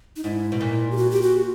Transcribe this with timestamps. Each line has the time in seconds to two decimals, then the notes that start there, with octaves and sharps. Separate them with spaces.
0.17 D#4
0.24 G#2 E4
0.52 B2
0.61 A#2
0.91 G4
0.97 F#4
1.11 G4
1.22 F#4